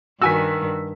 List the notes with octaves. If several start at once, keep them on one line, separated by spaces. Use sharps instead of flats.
G2 D#3 F#4 G#5 E6 B6